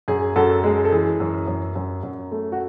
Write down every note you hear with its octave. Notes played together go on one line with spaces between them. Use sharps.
F#2 G#4
F#2 F#4 A4
G#3 G#4
A4
E3 G#4
F#2
F#2
F#2
F#2
A3
F#4